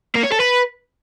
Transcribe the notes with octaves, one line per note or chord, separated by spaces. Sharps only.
A#3
C#5
A4
B4